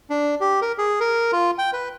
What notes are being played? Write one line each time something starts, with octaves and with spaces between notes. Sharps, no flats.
D4
G4
A#4
G#4
A#4
F4
G5
B4